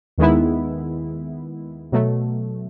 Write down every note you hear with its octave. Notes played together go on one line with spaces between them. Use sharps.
D#2 D#3 G#3 B3 E4
B2 F#3 A3